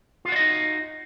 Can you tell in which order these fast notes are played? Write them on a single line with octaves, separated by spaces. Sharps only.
F4 F#4 D5 D#5 D#4